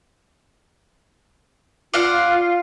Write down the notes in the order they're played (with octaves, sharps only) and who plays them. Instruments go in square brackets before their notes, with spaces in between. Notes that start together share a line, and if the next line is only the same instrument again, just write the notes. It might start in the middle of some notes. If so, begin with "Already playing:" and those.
[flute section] F4 [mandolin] D5 F5 F#5